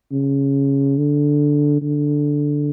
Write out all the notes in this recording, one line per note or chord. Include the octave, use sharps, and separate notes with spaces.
C#3
D3
D3